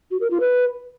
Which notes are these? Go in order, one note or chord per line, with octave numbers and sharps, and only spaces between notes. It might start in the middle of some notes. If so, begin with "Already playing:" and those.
F#4
A#4
F4
B4